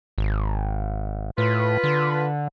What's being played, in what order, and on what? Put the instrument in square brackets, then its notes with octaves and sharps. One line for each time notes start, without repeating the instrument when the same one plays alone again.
[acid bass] G#1
[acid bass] A2 [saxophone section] F4 B4
[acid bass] D3